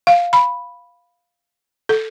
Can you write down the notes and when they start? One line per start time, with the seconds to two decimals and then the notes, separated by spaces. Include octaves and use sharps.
0.07 F5
0.33 B5
1.89 A4